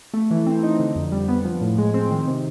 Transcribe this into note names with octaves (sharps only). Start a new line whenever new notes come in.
A3
E3
C4
D#4
D3
F2
G3
B3
F3
A2
G#3
C4
D#3
C3